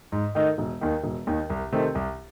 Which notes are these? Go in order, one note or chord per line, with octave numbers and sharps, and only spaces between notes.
G#2
D#3 A3 D#4 A4
E1
D#2 D#3
E1
D#2 D#3
C2
C3 D#3 A3 C4
C2